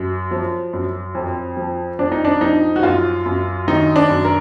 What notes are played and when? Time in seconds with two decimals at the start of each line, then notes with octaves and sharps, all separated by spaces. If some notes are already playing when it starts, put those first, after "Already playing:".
Already playing: F#2
0.31 F3
0.73 F#2
1.15 F2
1.57 F3
1.99 F2 D4
2.12 D#4
2.25 D4
2.41 F3 D#4
2.76 F#4
2.83 F#2 F4
3.26 F#2
3.68 D#3 D#4
3.96 D4
4.10 F#2
4.24 A#4